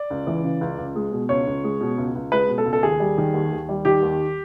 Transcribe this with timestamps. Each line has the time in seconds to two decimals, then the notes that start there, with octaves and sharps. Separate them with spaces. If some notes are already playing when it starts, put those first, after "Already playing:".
Already playing: D5
0.10 C#2
0.27 E3
0.44 C#3
0.61 C#2
0.78 C#2
0.95 G#3
1.12 B2
1.29 C#2 C#5
1.47 C#2
1.64 G#3
1.81 B2
1.98 C#2
2.15 C#2
2.32 G#3 B4
2.48 B2
2.58 A4
2.65 C#2
2.73 A4
2.83 D#2 G#4
3.00 G3
3.18 D#3
3.34 D#2
3.52 D#2
3.69 G3
3.85 D#3 G4
4.02 D#2